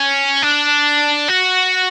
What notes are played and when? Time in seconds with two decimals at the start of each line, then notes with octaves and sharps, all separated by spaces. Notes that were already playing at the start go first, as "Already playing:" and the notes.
Already playing: C#4
0.43 D4
1.29 F#4